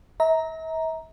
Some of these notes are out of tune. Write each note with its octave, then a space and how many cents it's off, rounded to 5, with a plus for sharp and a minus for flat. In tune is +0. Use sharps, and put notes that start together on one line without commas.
E5 -40 A#5 +0